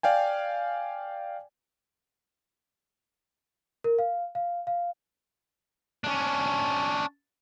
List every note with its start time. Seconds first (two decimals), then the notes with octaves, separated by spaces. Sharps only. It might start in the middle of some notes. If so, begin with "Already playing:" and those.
0.03 D5 F5 G5 G#5
3.84 A#4
3.99 F5
4.35 F5
4.67 F5
6.04 C#4 D4